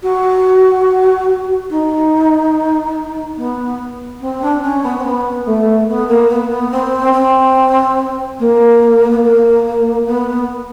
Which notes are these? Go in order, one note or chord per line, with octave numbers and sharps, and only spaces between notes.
F#4
D#4
B3
C4
D4
C#4
B3
C4
B3
A3
B3
A#3
B3
B3
C4
C4
A#3
B3
A#3
B3